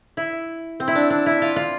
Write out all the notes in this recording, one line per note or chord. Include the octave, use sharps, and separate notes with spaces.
E4
C4
E4
D4
D4
E4
F4
F4